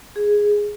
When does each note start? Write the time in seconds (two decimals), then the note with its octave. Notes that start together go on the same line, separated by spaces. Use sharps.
0.16 G#4